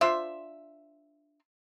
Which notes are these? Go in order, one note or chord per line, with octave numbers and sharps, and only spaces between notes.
D4 F4 C5 E5